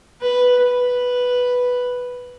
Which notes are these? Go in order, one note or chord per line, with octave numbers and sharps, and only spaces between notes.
B4
B4